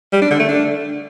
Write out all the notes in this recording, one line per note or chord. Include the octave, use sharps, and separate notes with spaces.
G3
D4
D3
A3
D4